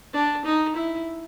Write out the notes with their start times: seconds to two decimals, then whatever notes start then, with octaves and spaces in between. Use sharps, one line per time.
0.13 D4
0.45 D#4
0.75 E4